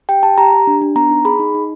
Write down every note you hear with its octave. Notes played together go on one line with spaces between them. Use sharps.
G4 G5
G4 A5
G4 A#5
G4
D4
D4
B3 A#5
D#4
G#4 B5
D#4
D#4